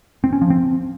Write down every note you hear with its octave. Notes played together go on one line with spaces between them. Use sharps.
C4
C#4
F3
C4